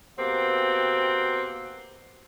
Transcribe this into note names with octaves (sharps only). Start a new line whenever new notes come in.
B2 A#3 C4 G4 F#5